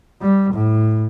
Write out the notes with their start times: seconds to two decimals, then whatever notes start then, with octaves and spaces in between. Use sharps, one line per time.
0.22 G3
0.54 A2